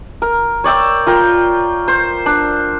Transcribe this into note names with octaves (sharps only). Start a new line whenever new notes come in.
A#4
C#5 D5 G5 E6
F4 A#4 G5
C5
D4